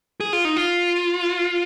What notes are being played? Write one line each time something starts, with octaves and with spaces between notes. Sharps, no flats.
G#4
F4
D#4
F4